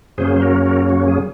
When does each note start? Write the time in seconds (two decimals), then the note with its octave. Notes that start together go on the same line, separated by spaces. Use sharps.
0.18 F#2 C#3 F#3 A#3 C#4 G#4 C5
0.36 C5
0.42 F#4 A#4
0.65 F#4 A#4
0.89 F#4
1.08 G#4